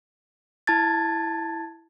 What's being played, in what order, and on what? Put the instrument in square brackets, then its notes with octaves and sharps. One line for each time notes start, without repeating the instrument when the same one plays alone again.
[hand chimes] E4 A5 G#6 A6